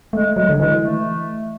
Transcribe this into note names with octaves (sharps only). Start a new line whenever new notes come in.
G#3 A3
F#3 G#3
D3
E3 G#3
A3